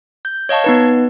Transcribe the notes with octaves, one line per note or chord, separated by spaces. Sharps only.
G6
C#5 D#5 F5 A5 C#6
B3 D#4 B4